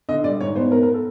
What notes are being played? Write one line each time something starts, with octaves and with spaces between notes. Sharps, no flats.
D3 D#5
G3 D5
G#2 C#5
B3 C5
B3 A#4
A#4
A4